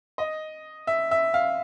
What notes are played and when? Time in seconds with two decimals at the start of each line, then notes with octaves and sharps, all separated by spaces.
0.18 D#5
0.87 E5
1.11 E5
1.34 F5